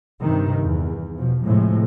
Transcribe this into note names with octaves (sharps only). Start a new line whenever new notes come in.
G2 C3 D#3
E2
B2 F3
A2 C3 F3 G#3